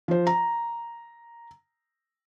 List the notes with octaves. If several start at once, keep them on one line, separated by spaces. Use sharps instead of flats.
F3 C5
A#5